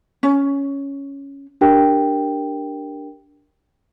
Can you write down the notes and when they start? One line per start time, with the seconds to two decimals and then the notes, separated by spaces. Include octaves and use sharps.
0.23 C#4
1.61 D4 G4 A#4 G5